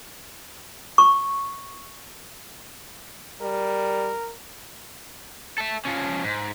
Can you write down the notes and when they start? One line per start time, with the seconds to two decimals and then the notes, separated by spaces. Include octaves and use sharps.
0.98 C#6
3.41 G3 A#4
5.58 A4 E5
5.85 F3 C#4
6.24 G#2